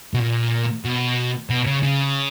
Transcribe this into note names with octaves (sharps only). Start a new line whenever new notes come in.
B2
A#2
B2
B2
C#3
C#3